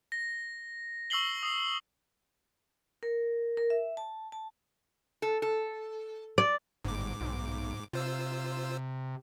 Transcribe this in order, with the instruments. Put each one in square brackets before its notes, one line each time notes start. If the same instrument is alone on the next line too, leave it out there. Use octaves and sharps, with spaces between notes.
[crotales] A#6
C#6 E6 A#6 C7 F#7 G7
D#6 C7
[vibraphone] A#4
A#4
E5
A5
A5
[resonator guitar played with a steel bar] A4
A4
[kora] D5
[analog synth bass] G1 [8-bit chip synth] G#2 D6
[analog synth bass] B1
[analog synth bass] C3 [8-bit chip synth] F4 C5 E6